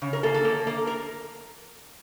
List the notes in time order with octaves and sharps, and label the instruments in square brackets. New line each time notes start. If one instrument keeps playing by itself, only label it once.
[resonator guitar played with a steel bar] C#3
A#4
A#3 A4
A4
A#3
A#3
A#4